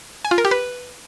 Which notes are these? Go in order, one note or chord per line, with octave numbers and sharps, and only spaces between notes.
G#5
F4
A#4
G4
B4